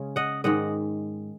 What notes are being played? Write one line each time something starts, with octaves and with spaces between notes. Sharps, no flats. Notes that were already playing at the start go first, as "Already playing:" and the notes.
Already playing: C#3 G#3 C#4
D#5 F#5
G#2 D#3 G#3 D#5 F#5